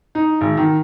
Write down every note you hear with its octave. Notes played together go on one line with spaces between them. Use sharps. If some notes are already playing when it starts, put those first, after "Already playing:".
D#4
G#1
D#3